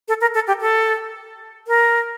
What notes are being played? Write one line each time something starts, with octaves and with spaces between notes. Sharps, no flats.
A4
A#4
A4
G4
A4
A#4